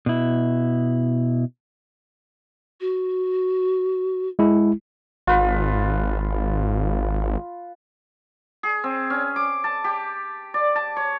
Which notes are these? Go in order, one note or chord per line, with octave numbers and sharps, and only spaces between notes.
B2 E4
F#4
G#3 E4
G#1 F4 B4
G#4
C4
C#4
D6
A5
G4
D5
A5
C#5